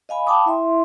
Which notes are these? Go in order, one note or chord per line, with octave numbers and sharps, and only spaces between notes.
D#5 F5 G#5 B5
F5 G5 A5 B5 D6 D#6
E4 E5 C6